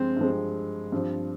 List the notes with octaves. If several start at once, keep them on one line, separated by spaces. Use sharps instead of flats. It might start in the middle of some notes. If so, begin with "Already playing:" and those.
Already playing: G2 F3 G#3 C4
G2 F3 G#3
G2 F3 C4